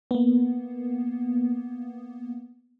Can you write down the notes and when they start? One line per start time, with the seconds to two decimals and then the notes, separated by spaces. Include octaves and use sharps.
0.11 A#3 B3